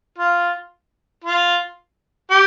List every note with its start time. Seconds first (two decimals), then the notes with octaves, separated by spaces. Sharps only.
0.19 F4
1.25 F4
2.31 G4